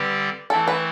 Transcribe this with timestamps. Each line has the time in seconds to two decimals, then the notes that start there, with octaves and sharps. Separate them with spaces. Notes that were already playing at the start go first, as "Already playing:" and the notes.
Already playing: D3 G3 C4 G4 B4 D5
0.50 E3 A3 C4 E4 A4
0.68 B4